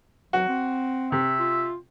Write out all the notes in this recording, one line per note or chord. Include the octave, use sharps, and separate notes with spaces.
F#3 F#4
C4
C3 E5
F4